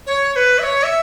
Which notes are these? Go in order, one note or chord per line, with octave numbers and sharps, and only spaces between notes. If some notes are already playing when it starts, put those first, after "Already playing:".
C#5
C#5
B4
E5
C#5
E5